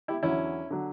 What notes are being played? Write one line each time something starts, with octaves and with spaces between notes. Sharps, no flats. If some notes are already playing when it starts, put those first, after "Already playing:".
E4 G4
E2 D3 F#3 C#4 E4
D3 F#3